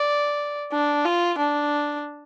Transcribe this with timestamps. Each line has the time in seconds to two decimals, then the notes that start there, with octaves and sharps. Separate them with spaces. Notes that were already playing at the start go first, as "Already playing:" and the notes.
Already playing: D5
0.73 D4
1.05 F4
1.38 D4